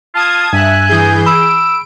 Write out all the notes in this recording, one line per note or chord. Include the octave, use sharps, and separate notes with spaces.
F4 A5 D#6 G#6
G2 E5 G#5 F#6
E3 G#4 G6
B5 E6 D7